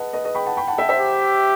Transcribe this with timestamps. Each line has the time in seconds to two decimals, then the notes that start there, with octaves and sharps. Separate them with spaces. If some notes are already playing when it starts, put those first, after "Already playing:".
Already playing: B4 D#5 F#5 A5
0.13 B4 D#5
0.25 B4 D#5
0.35 G5 B5
0.46 F#5 A5
0.57 G5 B5
0.67 F#5 A5
0.78 E5 G5
0.89 C5 E5
0.99 G4